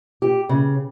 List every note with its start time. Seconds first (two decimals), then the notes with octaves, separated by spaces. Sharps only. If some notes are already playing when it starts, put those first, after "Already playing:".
0.22 G4
0.49 C#3